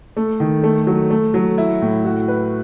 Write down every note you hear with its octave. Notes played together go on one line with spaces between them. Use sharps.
A3
D#3
A3
F#3
A3
F#3
E4
A2
F#4
B4